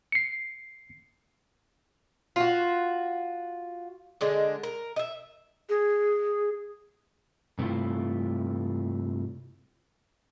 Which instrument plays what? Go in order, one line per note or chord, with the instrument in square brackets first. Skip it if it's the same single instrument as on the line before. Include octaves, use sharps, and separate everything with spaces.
[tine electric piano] C7 C#7
[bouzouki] F4 F#4
D3 G#3 D4
A#4
D#5 E5
[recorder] G#4
[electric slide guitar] G2 C3 A3 C4 E4 F4